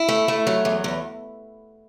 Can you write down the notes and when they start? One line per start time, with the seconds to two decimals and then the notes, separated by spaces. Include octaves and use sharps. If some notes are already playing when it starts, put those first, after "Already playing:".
Already playing: E4
0.09 A3
0.28 A3
0.47 F#3
0.65 E2
0.84 E2